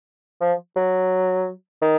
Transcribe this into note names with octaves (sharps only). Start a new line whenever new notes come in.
F3
F#3
D#3